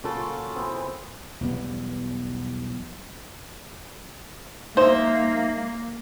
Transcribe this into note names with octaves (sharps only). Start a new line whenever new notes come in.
A#2 C#3 F#3 F4 A4
E3 B3 C4
B1 E2 G3 B3
A#3 D#4 C5 E5